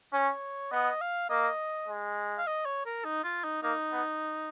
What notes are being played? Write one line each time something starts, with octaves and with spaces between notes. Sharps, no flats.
C#4 C#5
B3 D#5
F5
A#3 D#5
G#3
F5
D#5
C#5
A#4
D#4
F4
D#4
A#3 D#4
B3